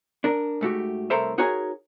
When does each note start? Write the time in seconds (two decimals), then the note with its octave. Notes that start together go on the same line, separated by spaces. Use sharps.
0.24 D4 A#4
0.61 G#2 A3 F#4 G4
1.10 C2 A2 A4 A#4 C5 E5
1.38 D#4 F#4 G#4 A#4 C#5 G#5